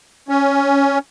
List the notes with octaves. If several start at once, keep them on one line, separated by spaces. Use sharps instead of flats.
C#4